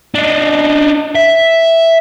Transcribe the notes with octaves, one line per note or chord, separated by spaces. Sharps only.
D4 D#4
E5